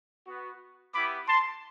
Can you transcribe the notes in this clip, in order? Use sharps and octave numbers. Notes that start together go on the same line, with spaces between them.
B3 F#4
B3 E4 G4 B5 D6
A5 C6